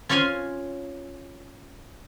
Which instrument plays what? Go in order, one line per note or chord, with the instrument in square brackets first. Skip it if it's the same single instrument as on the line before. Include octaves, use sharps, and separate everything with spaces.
[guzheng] C#4 F4 C#5 F5 G#5 C6